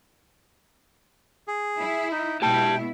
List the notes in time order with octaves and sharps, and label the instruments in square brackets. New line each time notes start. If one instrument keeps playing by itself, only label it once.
[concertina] G#4
[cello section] E4
[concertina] D#4
[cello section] B2 G#3 E4 [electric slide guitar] G4 A5 [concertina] G5